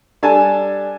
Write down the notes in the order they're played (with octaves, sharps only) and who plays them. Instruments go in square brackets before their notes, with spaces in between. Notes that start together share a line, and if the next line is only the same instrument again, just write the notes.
[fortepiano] G3 D4 A4 G#5 A5